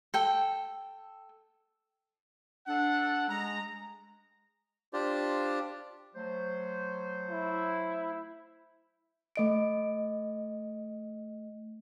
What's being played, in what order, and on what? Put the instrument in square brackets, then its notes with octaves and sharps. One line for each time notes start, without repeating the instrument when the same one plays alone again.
[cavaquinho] A4 G5
[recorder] D4 [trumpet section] A4 F#5
[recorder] G#3 [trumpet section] A#5
[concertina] D4 F4 G4 C5 D5
[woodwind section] F#3 A3 C5
[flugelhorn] E4
[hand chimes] A3 D#5 D7